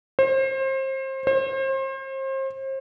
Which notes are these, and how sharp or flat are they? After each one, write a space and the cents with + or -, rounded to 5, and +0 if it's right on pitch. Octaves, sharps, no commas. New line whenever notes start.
C5 +30
C5 +35